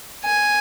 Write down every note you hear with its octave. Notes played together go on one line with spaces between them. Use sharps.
G#5